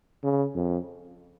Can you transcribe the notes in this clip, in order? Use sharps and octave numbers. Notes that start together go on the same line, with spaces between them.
C#3
F2